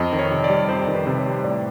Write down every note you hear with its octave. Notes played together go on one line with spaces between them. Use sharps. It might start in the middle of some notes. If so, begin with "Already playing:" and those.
Already playing: F2 D#5
D#3
C#5
C3
D5
G3
F2 C5
D#3
B4
C3
C#5
G3
A2 D5